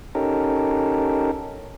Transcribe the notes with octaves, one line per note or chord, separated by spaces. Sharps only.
C#4 D#4 G4 A4 A#4